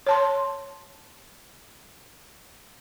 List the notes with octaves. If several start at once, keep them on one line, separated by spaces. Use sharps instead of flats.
C#5 A5 C6